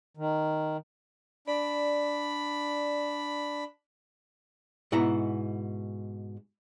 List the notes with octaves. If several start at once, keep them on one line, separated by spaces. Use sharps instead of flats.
D#3
D4 D5 B5
G#2 B2 E4 F#5 A#5